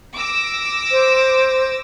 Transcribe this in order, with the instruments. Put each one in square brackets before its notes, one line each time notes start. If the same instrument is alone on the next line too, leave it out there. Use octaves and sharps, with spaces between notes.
[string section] D6 E6 A#6
[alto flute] C5